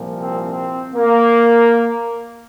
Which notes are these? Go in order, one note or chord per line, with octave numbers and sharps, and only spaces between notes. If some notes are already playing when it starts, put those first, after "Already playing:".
Already playing: C2 A#2 F3
C4
C4
A#3